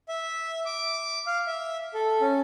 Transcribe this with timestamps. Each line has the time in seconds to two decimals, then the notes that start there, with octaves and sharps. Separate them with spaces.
0.09 E5
0.66 D6
1.27 F5
1.47 E5
1.94 A4
2.21 C#4